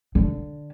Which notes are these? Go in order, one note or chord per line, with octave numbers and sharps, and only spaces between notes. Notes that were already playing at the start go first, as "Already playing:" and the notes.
D3